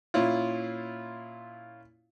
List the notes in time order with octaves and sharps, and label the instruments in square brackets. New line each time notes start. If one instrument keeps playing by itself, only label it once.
[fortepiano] A#2 C#4 E4 F4